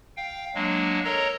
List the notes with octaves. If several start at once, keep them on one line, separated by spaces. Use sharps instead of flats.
F5 G5
F#3 G#3 A#3 D4
A4 A#4 C#5 D#5 A#5